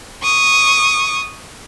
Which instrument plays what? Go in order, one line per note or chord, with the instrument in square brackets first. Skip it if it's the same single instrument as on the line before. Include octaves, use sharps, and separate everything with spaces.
[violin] C#6 D#6